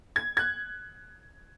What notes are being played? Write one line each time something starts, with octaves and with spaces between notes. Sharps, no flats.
G#6
F#6 G#6